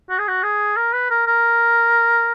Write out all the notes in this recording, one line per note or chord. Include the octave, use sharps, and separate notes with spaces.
F#4
G#4
F#4
G#4
A#4
B4
A#4
A#4